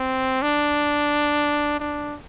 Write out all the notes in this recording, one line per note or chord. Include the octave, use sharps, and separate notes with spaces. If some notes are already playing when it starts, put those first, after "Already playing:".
Already playing: C4
D4
D4